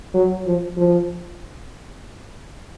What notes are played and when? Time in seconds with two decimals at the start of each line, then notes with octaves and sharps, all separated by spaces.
0.13 F#3
0.45 F3
0.77 F3